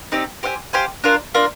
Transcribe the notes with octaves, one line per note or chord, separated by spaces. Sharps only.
C4 D#4 G4 D5
G4 C5 F5 G#5
G4 C5 F5 G#5
D4 F4 A#4
D4 F4 A#4